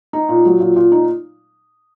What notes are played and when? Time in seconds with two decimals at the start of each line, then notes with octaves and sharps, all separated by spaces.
0.13 D#4
0.29 A#2
0.45 F#3
0.60 A#2
0.76 A#2
0.92 D#4